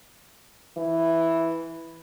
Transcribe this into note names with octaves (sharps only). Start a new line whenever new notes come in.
E3